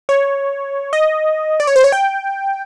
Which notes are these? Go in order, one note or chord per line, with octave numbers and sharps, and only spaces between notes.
C#5
D#5
D5
C#5
C5
C#5
G5